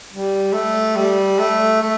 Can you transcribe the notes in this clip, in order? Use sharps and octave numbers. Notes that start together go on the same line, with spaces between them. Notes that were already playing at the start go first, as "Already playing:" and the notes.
G3
A3
G3
A3
A3